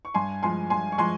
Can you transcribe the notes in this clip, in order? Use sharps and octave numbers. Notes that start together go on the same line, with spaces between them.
C#6
G2 G#5 C6
F3 G#3 G#5 C6
G2 G#5 C6
C#6
F3 G#3 G#5 C6